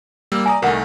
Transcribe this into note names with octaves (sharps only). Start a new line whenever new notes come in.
G3 A#3 E6
D5 G#5 A#5 D#6
C2 D#3 A3 A#4 F#5